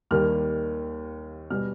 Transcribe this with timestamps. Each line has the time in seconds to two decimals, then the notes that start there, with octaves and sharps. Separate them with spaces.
0.11 D#2 D#3 G3 A#3 F6
1.50 B2 G3 B3 F6